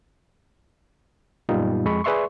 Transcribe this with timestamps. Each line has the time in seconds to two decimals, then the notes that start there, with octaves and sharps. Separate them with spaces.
1.49 F#2 A#2 G3 B3 D#4 F4
1.85 F2 G#3 B5 C#6
2.04 G#4 B4 D5 E5 C6 C#6